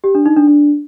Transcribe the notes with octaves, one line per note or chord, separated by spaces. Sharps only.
G4
D4
D#4
D4
D4